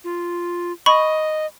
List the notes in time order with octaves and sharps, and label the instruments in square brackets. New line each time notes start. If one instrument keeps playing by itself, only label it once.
[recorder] F4
[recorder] D#5 [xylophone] B5 C#6